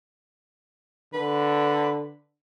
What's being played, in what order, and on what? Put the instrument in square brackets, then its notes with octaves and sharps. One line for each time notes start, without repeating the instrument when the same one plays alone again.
[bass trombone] D3 [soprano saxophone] B4